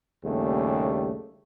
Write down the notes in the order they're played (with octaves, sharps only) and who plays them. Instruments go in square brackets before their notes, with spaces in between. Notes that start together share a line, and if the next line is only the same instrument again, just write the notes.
[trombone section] A#1 D#2 C#3 G3 A3 G#4